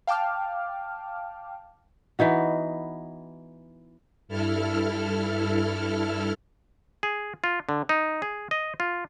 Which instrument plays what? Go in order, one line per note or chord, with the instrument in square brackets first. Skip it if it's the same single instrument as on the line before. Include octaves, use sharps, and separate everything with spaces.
[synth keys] F5 G5 A5 D6 F6
[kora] E3 B3 D#4 F#4
[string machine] G2 E4 A4 F6
[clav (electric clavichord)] G#4
F4
D3
D#4
G#4
D#5
F4